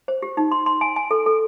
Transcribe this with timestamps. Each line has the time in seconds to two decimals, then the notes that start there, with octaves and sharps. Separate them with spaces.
0.08 C5
0.22 G4
0.37 D#4
0.51 C6
0.66 C6
0.81 G#5
0.96 G#5
1.11 A4
1.26 A4